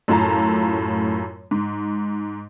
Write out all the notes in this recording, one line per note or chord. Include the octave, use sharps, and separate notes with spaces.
F#2 A2 F4 A5 A#5
G#2